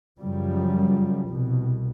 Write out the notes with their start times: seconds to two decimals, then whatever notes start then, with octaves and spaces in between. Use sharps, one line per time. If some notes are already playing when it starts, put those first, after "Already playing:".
0.19 F#2 C#3 F3 G3
1.29 C2 B2